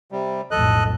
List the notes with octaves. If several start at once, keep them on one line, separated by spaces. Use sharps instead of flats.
C3 G3
B1 F2 A2 A4 D#5 F#6